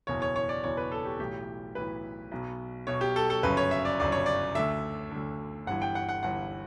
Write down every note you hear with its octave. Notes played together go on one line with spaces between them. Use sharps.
F#1 E2 B2 C#5
C#5
C#5
D5
F#1 E2 B2 C#5
B4
A4
G4
B1 A2 E3 G4
B1 A2 E3 B4
B1 B2
B1 B2 C#5
G4
A4
A4
G1 F#2 C#3 B4
C#5
E5
D5
G1 F#2 C#3 D5
C#5
D5
D2 D3 E5
D2 D3
G1 G2 E3 F#5
G5
F#5
F#5
G1 G2 E3 F#5